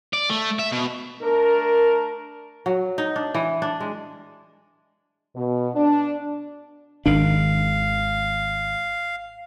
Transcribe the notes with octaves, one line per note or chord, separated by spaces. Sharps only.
D5
A3
E5
B2
A3 D4 A#4
F#3
D#4
D4
E3
D4
G#3
B2
D4
G#1 D#3 D4 F5